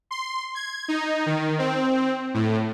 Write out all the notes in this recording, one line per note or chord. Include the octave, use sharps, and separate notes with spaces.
C6
G#6
D#4
D#3
C4
A2